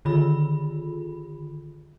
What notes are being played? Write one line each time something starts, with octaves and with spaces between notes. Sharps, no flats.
D3 D#3 F4 B5